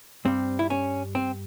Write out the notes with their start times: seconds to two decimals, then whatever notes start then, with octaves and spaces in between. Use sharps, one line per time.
0.25 G2 G3 C4
0.59 E4
0.70 C#4
1.15 C4